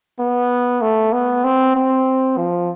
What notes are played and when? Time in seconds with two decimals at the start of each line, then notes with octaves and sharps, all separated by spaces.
0.19 B3
0.82 A3
1.12 B3
1.44 C4
1.75 C4
2.37 F3